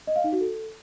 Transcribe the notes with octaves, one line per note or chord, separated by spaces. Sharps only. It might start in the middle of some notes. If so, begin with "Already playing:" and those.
D#5
F5
D#4
F#4
A4